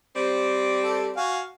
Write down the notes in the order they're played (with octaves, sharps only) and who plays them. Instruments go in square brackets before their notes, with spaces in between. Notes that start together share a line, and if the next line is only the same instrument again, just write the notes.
[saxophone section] G3 C4
[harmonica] A4
F#4 F5 G#5